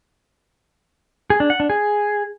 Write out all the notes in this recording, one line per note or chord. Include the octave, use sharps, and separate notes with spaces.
G#4
D4
F#5
D4
G#4